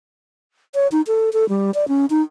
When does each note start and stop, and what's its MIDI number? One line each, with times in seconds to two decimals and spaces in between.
0.75 0.88 73
0.92 1.01 63
1.07 1.30 69
1.33 1.48 69
1.49 1.71 55
1.74 1.88 74
1.88 2.06 61
2.10 2.22 63